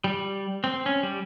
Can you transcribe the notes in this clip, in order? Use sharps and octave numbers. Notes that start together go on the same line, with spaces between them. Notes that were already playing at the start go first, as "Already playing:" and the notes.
G3
C4
C#4
G3